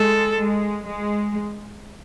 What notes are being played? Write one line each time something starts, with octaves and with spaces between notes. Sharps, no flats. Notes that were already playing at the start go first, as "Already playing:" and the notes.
Already playing: G#3 A4
G#3
G#3